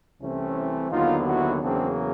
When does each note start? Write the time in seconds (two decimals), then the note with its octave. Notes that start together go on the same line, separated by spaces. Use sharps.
0.21 C2 C3 E3 A3 C4 C#4
0.91 D#2 D3 F#3 B3 D#4 F4
1.26 E4 F#4
1.61 E2 C#3 F#3 A#3 C4 D4